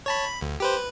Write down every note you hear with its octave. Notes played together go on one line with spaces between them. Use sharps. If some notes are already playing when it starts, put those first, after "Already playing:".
C#5 A5 B5
B5
D2
G4 B4 C5
B4